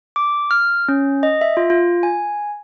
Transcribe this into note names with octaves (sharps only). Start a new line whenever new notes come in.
D6
F6
C#4
D#5
E5
F4
F4
G#5